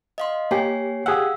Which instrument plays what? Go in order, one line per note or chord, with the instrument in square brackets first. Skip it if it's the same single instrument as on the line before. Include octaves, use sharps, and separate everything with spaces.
[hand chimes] D#5 F5 C6
[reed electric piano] A#3 G4 [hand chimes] C#5 G#5 C7
[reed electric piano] G4 G#4 F#5 [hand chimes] F5 E6